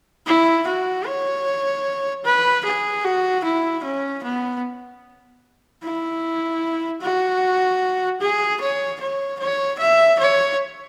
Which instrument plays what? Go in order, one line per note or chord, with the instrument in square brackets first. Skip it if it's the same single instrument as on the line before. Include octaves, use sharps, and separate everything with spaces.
[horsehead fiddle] E4
F#4
C#5
B4
G#4
F#4
E4
C#4
B3
E4
F#4
G#4
C#5
C#5
C#5
E5
C#5